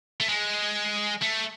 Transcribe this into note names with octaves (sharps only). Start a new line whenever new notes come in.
A3
G#3
A3